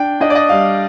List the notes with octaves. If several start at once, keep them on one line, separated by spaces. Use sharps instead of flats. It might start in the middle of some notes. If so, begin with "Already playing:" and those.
Already playing: D4 G5
D4 D#5
D5
D#5
G3 F5